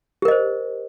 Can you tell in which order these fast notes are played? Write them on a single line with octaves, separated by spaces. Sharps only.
G4 A#4 D#5 C5